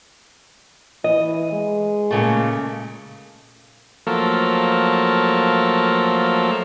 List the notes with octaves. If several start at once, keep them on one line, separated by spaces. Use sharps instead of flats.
E3 D#5
G#3
A#2 C#3 A3
F3 F#3 A3 A#3 A4 A#4